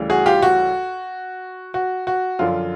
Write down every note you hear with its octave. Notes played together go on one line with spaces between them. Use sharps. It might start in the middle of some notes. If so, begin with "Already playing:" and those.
Already playing: D2 C#3 E3 G3
F#4 G#4
F4 G4
F#4
F#4
F#4
F#2 D3 F3 F4